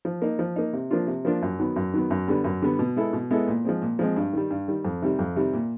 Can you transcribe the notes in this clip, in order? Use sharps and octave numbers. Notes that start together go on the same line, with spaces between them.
F3
A#3 D#4
F3
A#3 D#4
C3
F3 A#3 D4 F4
C3
F3 A#3 D4 F4
F#2
D#3 F#3 B3
F#2
D#3 F#3 B3
F#2
D3 G3 B3
F#2
D3 G3 B3
B2
G#3 B3 E4 A4
B2
G#3 B3 E4 A4
A#2
F3 G#3 C4
A#2
F3 G#3 C4
G2
D#3 G3
G2
D#3 G3
F2
C3 D#3 G3
F2
C3 D#3 G3
A#2